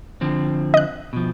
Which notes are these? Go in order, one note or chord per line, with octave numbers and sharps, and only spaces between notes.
D3 F3 C4
D#5 F#6
B2 F3